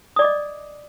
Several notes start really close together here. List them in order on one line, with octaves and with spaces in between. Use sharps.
D#6 D5 D6 D#5